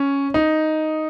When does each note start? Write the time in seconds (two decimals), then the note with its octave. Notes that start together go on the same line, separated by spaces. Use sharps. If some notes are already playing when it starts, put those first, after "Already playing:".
Already playing: C#4
0.34 D#4